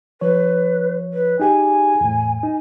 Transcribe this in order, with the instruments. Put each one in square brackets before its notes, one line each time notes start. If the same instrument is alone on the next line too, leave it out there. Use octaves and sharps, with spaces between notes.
[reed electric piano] F3 C#5 [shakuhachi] B4
[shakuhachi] B4
[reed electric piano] D#4 G4 G#4 [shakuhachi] G#5
[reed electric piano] E2 A2
D#4